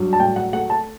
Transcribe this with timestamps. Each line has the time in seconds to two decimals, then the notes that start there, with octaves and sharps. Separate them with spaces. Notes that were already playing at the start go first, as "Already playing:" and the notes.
Already playing: G2 F#3
0.13 A5
0.19 A2 G5
0.36 F#5
0.53 A3 F#5
0.70 A5